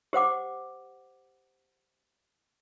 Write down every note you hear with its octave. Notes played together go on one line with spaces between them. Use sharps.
G4 C5 F#5 D6